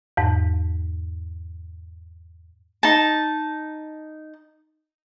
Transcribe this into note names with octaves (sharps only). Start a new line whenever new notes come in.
E2 G#2
D#4 A5